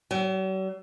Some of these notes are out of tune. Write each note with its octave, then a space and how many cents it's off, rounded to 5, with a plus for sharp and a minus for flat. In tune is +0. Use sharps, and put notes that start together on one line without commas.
F#3 +45